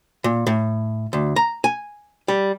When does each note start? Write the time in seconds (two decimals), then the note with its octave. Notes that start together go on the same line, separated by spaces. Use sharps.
0.24 A#2
0.47 A2
1.13 D2
1.36 A#5
1.64 G#5
2.28 G3